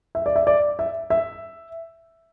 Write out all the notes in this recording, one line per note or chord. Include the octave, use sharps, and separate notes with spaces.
E5
D5
E5
D5
E5
E5